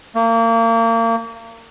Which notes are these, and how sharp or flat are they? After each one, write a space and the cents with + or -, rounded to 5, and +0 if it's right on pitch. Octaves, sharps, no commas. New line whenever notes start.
A#3 -30